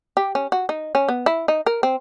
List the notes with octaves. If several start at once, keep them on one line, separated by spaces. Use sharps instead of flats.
G4
C#4
F#4
D#4
C#4
B3
E4
D#4
A#4
C4